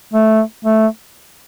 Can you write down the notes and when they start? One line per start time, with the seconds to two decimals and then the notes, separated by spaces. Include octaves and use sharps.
0.13 A3
0.65 A3